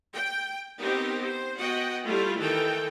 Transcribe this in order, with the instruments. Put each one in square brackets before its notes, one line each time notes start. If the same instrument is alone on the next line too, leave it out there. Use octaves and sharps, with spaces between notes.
[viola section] G5
B3 C4 D#4 G4 A#4
C5
B3 F#4 D#5 F#5 G5
G3 A3 E4 F4
D#3 E3 A4 G5